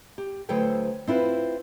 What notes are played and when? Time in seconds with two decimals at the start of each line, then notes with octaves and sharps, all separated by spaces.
0.18 G4
0.49 D2 F#3 A4 B4 C5 G5
1.07 C4 E4 F4 B4